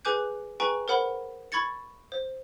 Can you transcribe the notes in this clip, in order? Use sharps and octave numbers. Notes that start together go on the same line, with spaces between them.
G#4 B4 G#5 D6 F#6 G6
G#4 B4 G5 G#5 A#5 C#6
A#4 C5 F#5 B5
B5 C#6 G#6 A6 C#7
C5